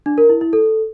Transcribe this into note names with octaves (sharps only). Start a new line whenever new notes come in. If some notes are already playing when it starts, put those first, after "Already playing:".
D4
A#4
E4
E4
A4